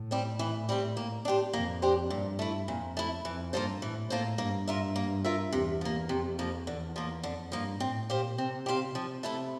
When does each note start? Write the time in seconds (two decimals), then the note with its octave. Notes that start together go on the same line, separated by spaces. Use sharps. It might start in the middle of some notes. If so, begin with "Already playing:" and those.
Already playing: A2
0.11 G3 C4 G4
0.39 E3
0.69 G3 C4 G4
0.97 A#3
1.25 D4 G4 C5
1.53 F2 A#3
1.82 D4 G4 C5
2.10 G2 A#2
2.39 A3 E4
2.67 F2 A#2
2.97 A3 E4
3.25 F2 E3
3.53 G2 A#3 F4 A4 C5
3.82 A2 E3
4.10 A2 A#3 F4 A4 C5
4.38 G2 A#3
4.68 F4 A#4 E5
4.96 A#3
5.25 F4 A#4 E5
5.52 E2 C3
5.81 F3 A#3
6.09 F2 C3
6.39 F3 A#3
6.67 E2 D3
6.96 F3 A#3
7.23 F2 D3
7.52 G2 F3 A#3
7.80 A2 C4
8.09 A#2 G4 C5 F5
8.38 C3 C4
8.66 G4 C5 F5
8.94 C3 F3
9.23 A3 E4 A4